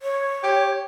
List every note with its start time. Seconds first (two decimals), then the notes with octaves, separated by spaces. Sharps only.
0.02 C#5
0.43 G4